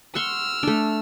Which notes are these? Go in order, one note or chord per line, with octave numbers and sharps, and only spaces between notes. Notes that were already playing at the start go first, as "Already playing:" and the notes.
F#5 C6 C#6 E6 F6
A3 D4